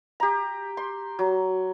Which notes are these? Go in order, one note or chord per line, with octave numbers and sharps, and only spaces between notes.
G4 A#5
C6
F#3